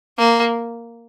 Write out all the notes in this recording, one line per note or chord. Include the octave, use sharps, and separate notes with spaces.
A#3